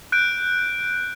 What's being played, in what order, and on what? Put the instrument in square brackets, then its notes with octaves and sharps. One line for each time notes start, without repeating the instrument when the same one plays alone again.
[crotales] F#6 G6 D7